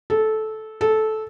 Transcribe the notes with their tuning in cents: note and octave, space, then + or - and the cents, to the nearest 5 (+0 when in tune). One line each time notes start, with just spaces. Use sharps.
A4 -15
A4 -15